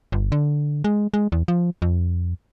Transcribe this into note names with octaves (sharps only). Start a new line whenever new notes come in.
G1
D3
G#3
G#3
E2
F3
F2